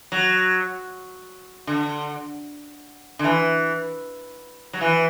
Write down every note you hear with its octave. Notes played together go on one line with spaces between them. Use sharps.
F#3
D3
D3
E3
F#3
E3